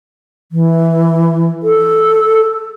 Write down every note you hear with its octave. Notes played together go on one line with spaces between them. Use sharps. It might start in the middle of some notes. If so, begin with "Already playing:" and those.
E3
A4